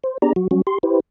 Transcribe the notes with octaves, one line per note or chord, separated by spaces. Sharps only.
C5
B3 D4 G4 G#4 D5 A#5
F#3 F#4
F#3 G3 C#4 F#4
G4 C6
E4 G4 B4 C5